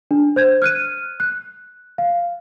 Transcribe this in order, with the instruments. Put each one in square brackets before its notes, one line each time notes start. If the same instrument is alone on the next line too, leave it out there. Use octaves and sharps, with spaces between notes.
[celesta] D4
C5 G6 G#6
F6 F#6 D#7
F#6
F5